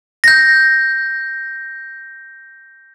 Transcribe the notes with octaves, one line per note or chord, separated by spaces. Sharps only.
G6 A#6